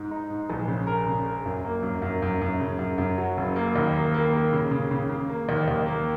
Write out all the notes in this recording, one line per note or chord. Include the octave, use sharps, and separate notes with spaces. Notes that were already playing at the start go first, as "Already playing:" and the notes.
Already playing: G#2
D#4
G#2
A#1
C#3
A#4
C#3
A#4
F#2
A#3
F#2
F#2
F#2
F#2
C#3
F#2
F#2
F#3
F#1
A#3
D#2
A#3
A#3
A#3
C#3
C#3
C#3
C#3
A#3
D#2
D#2
A#3